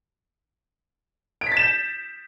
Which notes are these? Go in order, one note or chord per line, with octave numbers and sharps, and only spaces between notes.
D7
B6
A6
E7
G6